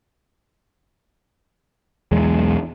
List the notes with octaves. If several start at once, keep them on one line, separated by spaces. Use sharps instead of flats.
B1 E2 G#3